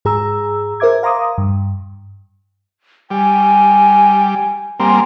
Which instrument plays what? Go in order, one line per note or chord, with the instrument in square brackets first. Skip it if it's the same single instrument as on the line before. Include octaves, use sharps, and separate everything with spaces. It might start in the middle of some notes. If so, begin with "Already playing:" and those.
[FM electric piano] G#2 G#4 A#5 E6
A#4 C5 E5 D6 G#6
F5 A#5 C6 D6 D#6
G2
[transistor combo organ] G3 [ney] G#5
[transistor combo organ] G3 A#3 C4 [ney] G#5